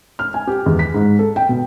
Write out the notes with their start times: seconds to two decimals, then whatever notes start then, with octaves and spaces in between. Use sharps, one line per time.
0.19 F6
0.34 G#5
0.47 G4
0.66 E2
0.79 B6
0.94 G#2
1.19 A4
1.36 G5
1.49 B2